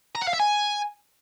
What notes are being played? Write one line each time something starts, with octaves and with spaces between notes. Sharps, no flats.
A#5
F#5
F5
E5
G#5